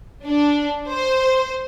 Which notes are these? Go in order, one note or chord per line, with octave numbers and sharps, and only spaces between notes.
D4
C5